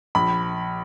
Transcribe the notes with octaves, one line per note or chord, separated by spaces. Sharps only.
A#1 B5